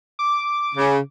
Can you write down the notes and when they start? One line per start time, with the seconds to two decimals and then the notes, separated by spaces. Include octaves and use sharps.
0.19 D6
0.75 C#3